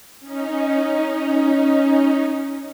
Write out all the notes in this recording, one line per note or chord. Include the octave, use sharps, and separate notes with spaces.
C#4 D#4